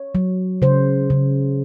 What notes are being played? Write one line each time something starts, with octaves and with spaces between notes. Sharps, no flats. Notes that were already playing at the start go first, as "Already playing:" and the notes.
Already playing: C#5
F#3
C#3 C5
C#3